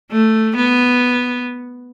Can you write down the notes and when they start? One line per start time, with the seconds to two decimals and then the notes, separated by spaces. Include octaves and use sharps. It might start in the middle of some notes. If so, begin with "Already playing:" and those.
0.11 A3
0.56 B3